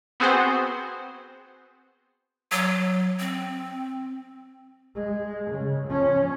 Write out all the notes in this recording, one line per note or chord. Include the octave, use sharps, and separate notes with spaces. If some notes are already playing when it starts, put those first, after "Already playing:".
B3 C4 F#4 G#4 C5
F#3
C4
G#3
C#3
F3 C#4